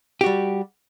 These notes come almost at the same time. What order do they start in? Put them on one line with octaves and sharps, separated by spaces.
G4 F#4 G3